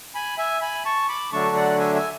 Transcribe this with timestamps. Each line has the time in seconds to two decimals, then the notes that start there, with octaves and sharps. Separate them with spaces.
0.15 G#5 B5
0.38 E5 G#5
0.62 G#5 B5
0.85 A5 C#6
1.09 B5 D6
1.32 D3 F#3 A3 D4 A5 C#6
1.56 D5 F#5
1.79 E5 G#5
1.95 E5 G#5